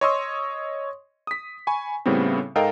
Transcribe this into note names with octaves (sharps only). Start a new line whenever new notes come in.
C#5 D#5 C6 C#6 D#6 E6
D#6 B6
G#5 B5 C#6
A2 C#3 G3 B3 C4
G#2 A4 A#4 D#5 F5 G5